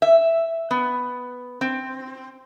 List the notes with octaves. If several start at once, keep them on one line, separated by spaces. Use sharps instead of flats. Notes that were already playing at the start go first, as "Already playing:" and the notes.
E5
B3
C4